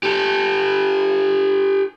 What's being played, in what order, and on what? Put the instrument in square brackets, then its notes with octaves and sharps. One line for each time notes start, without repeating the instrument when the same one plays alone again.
[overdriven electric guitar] G4 A4